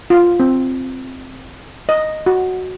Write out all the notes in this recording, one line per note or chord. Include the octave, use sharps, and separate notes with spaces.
F4
C4
D#5
F#4